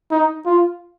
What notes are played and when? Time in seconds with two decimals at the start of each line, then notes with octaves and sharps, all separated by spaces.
0.11 D#4
0.46 F4